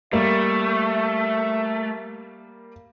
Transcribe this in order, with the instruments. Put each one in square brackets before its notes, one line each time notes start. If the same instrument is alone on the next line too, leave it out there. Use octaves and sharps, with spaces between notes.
[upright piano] G3 A#3 [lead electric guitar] A3 [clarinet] E5